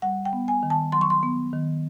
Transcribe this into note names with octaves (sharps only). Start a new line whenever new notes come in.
G3 F#5
G5
B3
G#5
D#3
A5
F#3 C6
C#6
C6
B3
D#3